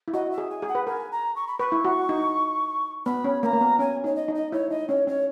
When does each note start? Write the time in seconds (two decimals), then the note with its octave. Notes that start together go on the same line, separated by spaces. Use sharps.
0.08 E4
0.13 F#4 D#5
0.31 E5
0.38 G#4
0.50 G#5
0.62 G#4
0.68 F#5
0.75 B4
0.86 A#4 G#5
1.12 A#5
1.36 C#6
1.47 B5
1.59 B4 C#6
1.72 E4
1.85 F#4
2.09 D#4
3.06 B3 B5
3.24 C#4
3.42 A#3 A#5 B5
3.53 A#3
3.61 B3
3.79 C#4 G#5
4.04 D#4 C#5
4.15 D#5
4.28 D#4
4.35 D#5
4.52 E4 C#5
4.70 D#4 D#5
4.88 C#4 C#5
5.07 C#4 C#5